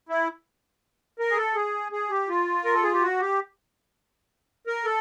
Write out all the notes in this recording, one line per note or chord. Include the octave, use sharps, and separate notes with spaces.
E4
A#4
G#4
A4
G#4
G#4
G4
F4
A#4
A4
G#4
G4
F#4
G4
A#4
A4